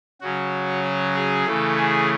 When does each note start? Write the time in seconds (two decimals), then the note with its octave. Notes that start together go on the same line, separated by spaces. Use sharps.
0.21 C#3 F#3 C#4 F#4
0.84 F#4
1.15 G#4
1.46 C#3 E3 A3 A4
1.77 G#4